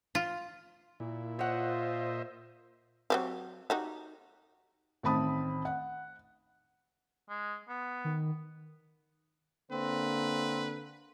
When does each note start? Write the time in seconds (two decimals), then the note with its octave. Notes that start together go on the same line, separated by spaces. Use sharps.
0.15 F4
1.00 A#2 E4
1.39 F4 C5 C#5 D#5 E5 F#5
3.10 F#3 C4 G4
3.70 D#4 F#4 G4
5.03 A1 D#3 C4 A5 B5 D#6
5.65 F#5
7.30 G#3
7.69 B3
8.05 D#3
9.71 D3 A#3 C4 B4